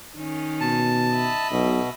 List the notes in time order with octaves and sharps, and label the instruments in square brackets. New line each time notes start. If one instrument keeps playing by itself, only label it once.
[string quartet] D#3 C#4
[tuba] B2 [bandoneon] A5
[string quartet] D#5 E5 B5
[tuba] B1 [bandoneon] B2